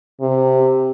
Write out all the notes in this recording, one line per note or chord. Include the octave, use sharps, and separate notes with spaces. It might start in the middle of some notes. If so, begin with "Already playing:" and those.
C3